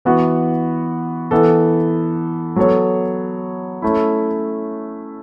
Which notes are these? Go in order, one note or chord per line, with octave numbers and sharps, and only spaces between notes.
E3 B3 F#4
E3 B3 A4
F#3 B3 A4 C#5
A3 C#4 E4